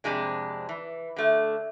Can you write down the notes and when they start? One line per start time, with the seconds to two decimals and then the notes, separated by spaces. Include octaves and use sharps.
0.04 F2 C3 G#3 D4
0.69 E3
1.16 D3 A3